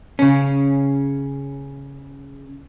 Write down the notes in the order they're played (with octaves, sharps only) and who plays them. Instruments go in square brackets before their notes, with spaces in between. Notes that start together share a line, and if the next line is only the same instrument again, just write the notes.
[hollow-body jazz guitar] C#3 C#4